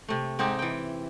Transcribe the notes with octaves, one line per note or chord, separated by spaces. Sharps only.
C3 A3
G#2 C4 D#4 G4
E3 G5